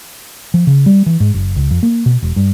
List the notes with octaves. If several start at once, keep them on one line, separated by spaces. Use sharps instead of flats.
F3
C#3
G3
E3
G#2
F#1
C#2
F2
A#3
B2
E1
G2